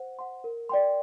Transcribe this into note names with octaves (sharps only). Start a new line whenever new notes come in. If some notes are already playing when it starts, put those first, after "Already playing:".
Already playing: C5 F#5
F#5 C6
A#4
D5 G5 C6